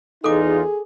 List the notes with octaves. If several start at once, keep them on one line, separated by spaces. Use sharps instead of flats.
E2 D#4 F4 G#4 A4 D6